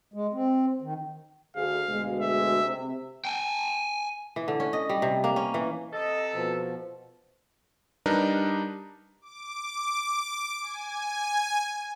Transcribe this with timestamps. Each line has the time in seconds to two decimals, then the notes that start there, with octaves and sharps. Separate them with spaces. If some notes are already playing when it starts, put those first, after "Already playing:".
0.14 G#3
0.33 C4
0.82 D#3
1.56 D2 G#4 F5
1.89 D2 B2 G#3
2.20 E5
2.64 C3
3.25 G5 G#5
4.36 E3
4.48 D3
4.60 C#4
4.73 D#5
4.89 G3
5.02 C3
5.24 A#3
5.36 C#4
5.54 E3
5.93 C3 A4 D#5
6.33 B2 F3
8.06 G3 D4 D#4 A#4 B4
9.22 D6
10.62 G#5